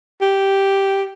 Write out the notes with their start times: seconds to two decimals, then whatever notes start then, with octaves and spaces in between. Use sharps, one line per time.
0.21 G4